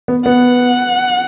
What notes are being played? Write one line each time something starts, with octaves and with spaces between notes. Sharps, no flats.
B3
B3 F#5